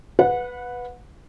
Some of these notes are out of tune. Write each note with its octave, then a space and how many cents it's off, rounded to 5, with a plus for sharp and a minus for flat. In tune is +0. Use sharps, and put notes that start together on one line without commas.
B4 +0 F#5 -30